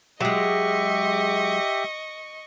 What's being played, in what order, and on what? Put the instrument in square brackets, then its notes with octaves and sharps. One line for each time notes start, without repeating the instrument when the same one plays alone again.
[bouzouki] F#3 G#3 [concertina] G4 E5 [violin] D#5 C#6